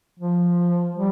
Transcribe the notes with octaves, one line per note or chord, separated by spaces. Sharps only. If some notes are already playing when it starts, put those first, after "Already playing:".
F3
G3